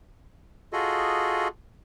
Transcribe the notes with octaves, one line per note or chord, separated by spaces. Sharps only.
F4 F#4 G#4 A4 D#5